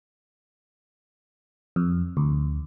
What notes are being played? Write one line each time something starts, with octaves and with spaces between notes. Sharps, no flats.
F2
D2